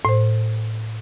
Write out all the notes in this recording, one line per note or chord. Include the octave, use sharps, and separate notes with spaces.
A2 C5